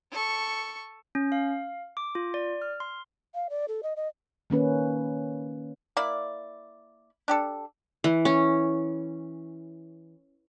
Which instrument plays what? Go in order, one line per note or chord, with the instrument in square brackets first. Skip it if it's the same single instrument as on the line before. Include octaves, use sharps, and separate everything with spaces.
[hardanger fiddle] A4 C#6
[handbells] C#4
F5
D6
F4
D5
F6
C6
[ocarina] F5
D5
A4
D#5
D#5
[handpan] D#3 A#3 C#4 B4
[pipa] A#3 E4 D5
D4 G4 A4
[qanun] E3
C#4